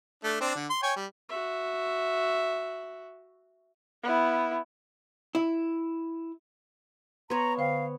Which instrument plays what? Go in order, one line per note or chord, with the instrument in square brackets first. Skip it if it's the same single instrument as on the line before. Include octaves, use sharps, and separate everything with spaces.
[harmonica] A3 D4
C4 D4
D3
C6
C#5 G5 G#5
G3
[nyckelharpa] F#4 E5
[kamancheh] B3 E4
[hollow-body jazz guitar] E4
[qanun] B3 C#5 [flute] A#5 [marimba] C6
[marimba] D3 C5 G5 [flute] F5